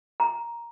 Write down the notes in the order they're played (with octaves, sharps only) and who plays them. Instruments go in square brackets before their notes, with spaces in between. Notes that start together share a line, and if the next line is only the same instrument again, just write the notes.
[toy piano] A#5